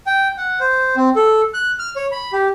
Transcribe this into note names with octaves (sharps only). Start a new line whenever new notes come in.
G5
F#5
C5
C4
A4
F#6
F6
C#5
B5
G4